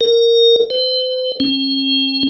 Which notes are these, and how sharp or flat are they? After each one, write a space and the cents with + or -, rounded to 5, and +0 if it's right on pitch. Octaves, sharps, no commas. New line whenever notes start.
A#4 -10
C5 -40
C#4 -45